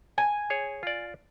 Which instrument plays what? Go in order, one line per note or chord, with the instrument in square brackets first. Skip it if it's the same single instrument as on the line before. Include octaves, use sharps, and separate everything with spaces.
[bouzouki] G#5
[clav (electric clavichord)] G#4 C#5
F4 D5